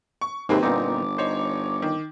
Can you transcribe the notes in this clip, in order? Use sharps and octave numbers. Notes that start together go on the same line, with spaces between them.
C#6
D#2 G#2 C3 A#3 C4 G4 B4
G1 A#2 B3 C4 D#4 D6
D#4 C5 C#5
D#3